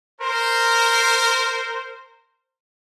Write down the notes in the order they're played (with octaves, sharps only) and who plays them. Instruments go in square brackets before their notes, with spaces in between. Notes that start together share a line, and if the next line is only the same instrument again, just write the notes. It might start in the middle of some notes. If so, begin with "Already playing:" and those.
[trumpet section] A#4 C5